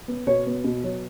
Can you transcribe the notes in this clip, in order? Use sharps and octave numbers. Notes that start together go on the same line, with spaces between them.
B3
B2 C#5
B3
B2
F#3